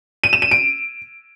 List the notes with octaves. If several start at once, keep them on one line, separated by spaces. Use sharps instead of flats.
D#7
E7
D#7
D7